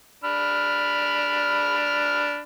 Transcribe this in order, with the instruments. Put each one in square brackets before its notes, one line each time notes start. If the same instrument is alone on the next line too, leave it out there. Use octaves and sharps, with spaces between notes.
[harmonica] D4 B5 F6